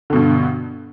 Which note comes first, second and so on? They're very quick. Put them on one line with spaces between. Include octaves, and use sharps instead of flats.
D3 B2 G2